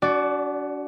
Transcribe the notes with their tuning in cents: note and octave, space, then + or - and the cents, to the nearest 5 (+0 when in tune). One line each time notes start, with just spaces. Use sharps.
D4 -40 F#4 +15 D5 +0